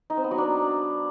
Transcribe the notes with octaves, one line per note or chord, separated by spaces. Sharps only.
D#4
C4
B3
F#3
D4